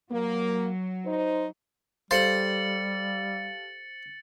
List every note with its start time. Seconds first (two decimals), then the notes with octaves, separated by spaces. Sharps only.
0.11 F#3 A#3
1.05 D#4 C5
2.11 G3 G4 A4 C5 F5 A6 C#7 F#7